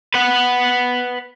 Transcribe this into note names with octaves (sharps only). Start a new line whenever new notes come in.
B4 F#5